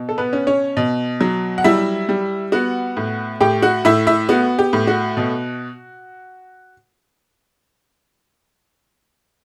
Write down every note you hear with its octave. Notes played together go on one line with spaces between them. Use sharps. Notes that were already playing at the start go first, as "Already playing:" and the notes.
Already playing: B2
A4
B3 B4
C#4
C#4 C#5
B2
F#3
F#5
G3 E4 E5
G3
B3 F#4 F#5
A2
A2 G4 G5
F#4 F#5
A2 E4 E5
E4 E5
B3 F#4
G4
A2
F#4
B2